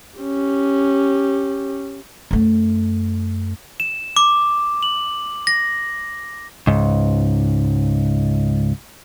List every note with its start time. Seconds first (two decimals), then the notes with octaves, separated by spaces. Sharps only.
0.19 C#4 G4
2.31 F#2 A3
3.80 E7
4.17 D6
4.83 F#7
5.47 A#6
6.67 C#2 G#2